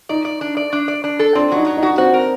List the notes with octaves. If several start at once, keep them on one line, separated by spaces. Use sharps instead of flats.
D#4 D5
D5
D4
D5
D4
D5
D4
A4
C4 D4
F#3 D#4
F#3
D#4
F#4
C4 F#4
A#4